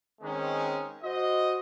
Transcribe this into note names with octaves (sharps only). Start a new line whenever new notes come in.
D#3 G#3 C4 C#4 D#4
F#4 C5 D#5